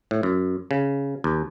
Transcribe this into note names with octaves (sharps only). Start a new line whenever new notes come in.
A2
F#2
C#3
D#2